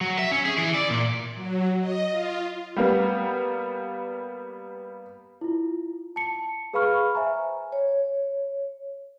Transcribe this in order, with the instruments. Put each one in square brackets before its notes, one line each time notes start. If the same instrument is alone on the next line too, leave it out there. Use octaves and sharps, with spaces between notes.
[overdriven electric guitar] F#3
E5
C#4
G#4
E3
D5
A#2
[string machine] F#3
D#5
F4
[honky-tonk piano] G3 A#3 B3
[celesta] E4 F4
A5 C#7
G#4 B4 F5 B5 C#6 F6
C5 E5 G#5 A#5
[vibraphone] C#5